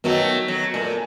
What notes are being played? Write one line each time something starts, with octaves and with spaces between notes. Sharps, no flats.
D#3 F#3 A3 B3 F#4 D#5
F#3
A#2 A3 A#4